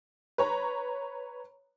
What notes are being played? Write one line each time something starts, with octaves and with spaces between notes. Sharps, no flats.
B4 C#5 A#5